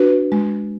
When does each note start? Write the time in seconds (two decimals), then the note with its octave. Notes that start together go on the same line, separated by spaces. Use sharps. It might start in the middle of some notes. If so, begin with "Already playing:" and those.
Already playing: D4 F#4 B4
0.32 G#3